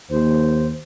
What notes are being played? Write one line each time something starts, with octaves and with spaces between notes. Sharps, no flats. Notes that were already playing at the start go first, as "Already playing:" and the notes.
D#2 C5